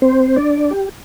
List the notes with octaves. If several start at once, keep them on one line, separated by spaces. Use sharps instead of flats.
C4 C5
D4 D5
G4